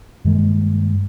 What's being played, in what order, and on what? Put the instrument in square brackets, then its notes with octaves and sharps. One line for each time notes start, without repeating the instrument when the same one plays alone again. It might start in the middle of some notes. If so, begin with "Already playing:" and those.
[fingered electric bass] G2 D#3 G#3 A#3